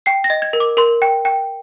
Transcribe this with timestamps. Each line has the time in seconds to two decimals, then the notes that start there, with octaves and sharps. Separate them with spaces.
0.06 G5 C7
0.24 A#6
0.30 D#5
0.42 G#6
0.53 A#4
0.60 D6
0.77 A#4 C6
1.02 G5
1.25 G5